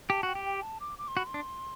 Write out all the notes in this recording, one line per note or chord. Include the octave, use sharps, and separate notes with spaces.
G4 A5
F#4 G5
G4
G5
A5
D6
D6
C6
F#4 B5
C6
D4